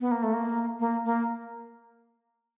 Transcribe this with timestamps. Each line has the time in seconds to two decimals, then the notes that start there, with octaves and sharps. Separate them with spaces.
0.01 B3
0.11 A#3
0.23 A3
0.34 A#3
0.79 A#3
1.05 A#3